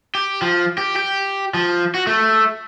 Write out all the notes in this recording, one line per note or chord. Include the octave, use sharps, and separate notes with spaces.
G4
F3
G4
G4
F3
F#4
A3